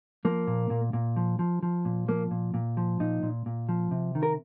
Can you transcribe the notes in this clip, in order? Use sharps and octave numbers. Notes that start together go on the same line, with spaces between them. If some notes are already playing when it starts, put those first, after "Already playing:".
F3 A#3
A#2
A#2
A#2
F3
F3
F3
A#2
F3 A#3
A#2
A#2
F3
A#2 D#4
A#2
A#2
F3
C3
D#3
A#4